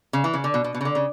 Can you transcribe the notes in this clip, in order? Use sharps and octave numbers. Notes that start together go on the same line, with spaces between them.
C#3
E3
C#3
D3
B2
B2
B2
C#3
D3
C#3